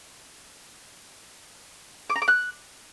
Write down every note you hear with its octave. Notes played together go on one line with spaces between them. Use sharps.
D6
A#5
D6
F#6